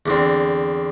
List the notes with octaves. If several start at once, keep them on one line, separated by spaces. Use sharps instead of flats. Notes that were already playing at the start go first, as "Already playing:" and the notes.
E2 D3 C4